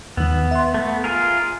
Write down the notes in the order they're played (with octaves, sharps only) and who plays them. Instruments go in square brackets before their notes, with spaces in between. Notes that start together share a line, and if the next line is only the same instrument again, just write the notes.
[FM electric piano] D#2 D#3 [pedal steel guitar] B3
[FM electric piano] E5 C6
[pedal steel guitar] A3 B3
F4 G#4 A#4